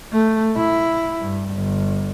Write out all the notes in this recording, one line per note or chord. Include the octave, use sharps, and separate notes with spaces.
A3
E4
G2
G1